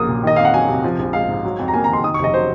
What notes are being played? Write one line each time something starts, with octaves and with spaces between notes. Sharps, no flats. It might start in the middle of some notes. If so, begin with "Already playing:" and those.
Already playing: A#1 F#3 A#3 D#6
A#2
D#3 D#5
F2 F5
F#5
F#3 G#5
C3
F3
A#1
G#3 F5
G#2
F#3
F2
A#5
A#3 G#5
D#3 A#5
C6
D#3 D#6
C#6
F1 D#5
F#3 C5